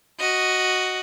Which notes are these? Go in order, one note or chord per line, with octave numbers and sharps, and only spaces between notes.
F#4 D#5